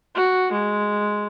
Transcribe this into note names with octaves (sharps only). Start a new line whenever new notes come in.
F#4
G#3